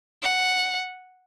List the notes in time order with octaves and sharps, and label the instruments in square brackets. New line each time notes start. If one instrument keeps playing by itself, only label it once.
[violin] F#5